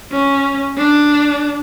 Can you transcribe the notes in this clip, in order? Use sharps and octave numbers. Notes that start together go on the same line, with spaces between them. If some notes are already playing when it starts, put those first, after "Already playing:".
C#4
D4